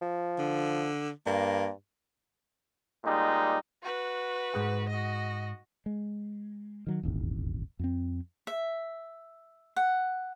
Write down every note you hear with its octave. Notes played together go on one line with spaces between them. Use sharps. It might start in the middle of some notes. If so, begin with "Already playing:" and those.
F3
D3
G2 A#3
A#2 G3 G#3 D#4
F#4 B4
G#2 G#4 F#5
F#4 D#5
G#3
D#3 F#3
D#1 G#1 E2
F2 C4
E5
F#5